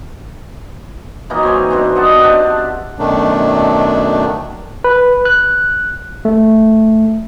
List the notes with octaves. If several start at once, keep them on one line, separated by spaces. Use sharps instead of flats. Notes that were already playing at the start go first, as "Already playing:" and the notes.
E3 F#3 A#3 D#4
C4 C#5 G#5
G2 B2 C4
D#5 F#5 A5
C4 D4 G4 F#5
F#2 B2 D#3 F#3 A3 D4
B4
F#6
A3